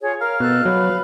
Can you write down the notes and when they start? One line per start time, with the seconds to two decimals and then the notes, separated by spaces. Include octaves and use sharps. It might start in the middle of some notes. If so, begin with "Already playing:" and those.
0.01 F4 G#4 C#5
0.21 A#4 F5
0.40 B2 A4 F#6
0.65 F#3 B4